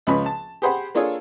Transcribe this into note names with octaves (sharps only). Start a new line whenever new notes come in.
C#2 F3 C#4 B4 B5
A5
G4 G#4 C5 F#5 B5
A#3 D4 F4 G#4 A4 C#5